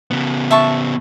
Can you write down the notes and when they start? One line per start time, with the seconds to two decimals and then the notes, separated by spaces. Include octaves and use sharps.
0.11 C#3 B3
0.51 E5 A5 C#6